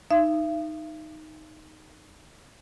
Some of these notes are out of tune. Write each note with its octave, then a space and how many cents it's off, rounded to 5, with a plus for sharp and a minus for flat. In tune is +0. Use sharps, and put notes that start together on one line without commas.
D#4 +0 E5 +45